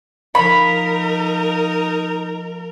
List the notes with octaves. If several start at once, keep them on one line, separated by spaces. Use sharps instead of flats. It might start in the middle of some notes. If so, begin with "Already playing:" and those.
F3 A#3 D#4 A#4 B5